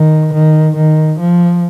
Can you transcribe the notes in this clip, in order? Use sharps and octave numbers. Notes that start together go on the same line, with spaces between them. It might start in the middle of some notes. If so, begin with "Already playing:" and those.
Already playing: D#3
D#3
D#3
F3